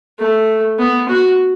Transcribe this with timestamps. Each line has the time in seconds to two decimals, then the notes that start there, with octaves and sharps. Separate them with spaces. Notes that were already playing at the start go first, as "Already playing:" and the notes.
0.19 A3
0.78 B3
1.08 F#4